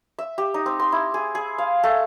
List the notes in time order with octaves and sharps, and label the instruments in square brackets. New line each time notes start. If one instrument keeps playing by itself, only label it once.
[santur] E5
G4
D#4
C4
C6
E4
G#4
G#4
F5
A3